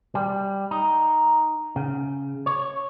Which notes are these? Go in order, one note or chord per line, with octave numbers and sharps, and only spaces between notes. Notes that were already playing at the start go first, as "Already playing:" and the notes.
G3
D#4
C#3
C#5